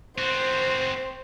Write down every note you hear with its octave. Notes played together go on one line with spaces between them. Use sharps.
C4 F#4 C5